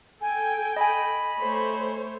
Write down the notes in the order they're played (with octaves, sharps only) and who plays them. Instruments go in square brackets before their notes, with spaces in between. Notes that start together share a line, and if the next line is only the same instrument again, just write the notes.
[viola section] A4 G5 [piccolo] G#5
[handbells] D#5 G#5 [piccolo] B5
[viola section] A3 C5 C#5